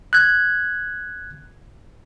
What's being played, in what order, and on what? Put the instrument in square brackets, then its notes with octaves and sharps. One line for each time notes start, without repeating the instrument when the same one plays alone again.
[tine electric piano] F#6 G#6